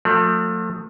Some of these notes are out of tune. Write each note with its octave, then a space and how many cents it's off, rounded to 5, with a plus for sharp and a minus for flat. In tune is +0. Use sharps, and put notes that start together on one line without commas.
F3 +45 A3 +25